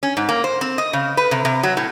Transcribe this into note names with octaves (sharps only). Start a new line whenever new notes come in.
C#4
G#2
A#3
C5
C4
D#5
C#3
B4
C3
C3
F#3
A2